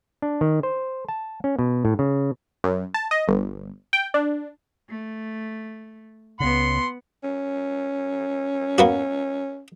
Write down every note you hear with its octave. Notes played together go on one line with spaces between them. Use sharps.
D4
D#3
C5
A5
C#4
B2
A2
C#3
F#2
A5
D#5
G1
G5
D4
A3
C#2 C#3 B3 F#5 C6
C#4
A#3 B3 F#4